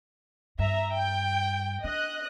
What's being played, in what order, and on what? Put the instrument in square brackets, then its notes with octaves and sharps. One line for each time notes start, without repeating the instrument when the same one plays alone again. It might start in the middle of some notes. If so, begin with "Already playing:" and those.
[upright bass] G2 [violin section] E5 A#5
[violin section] G5
[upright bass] D4 [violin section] D#5 F#6